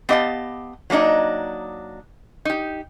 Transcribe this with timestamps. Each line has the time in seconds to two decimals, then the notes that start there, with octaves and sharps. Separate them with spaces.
0.09 B3 G4 D#5 F5 A5
0.90 F#3 A#3 D4 D#4 D#5
2.45 D#4 G4